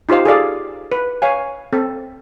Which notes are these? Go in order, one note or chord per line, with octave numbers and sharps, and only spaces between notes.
D#4 F4 G4 C5 F5
G#4 A4 D5 F5
B4
C#5 F5 G#5
C4 A4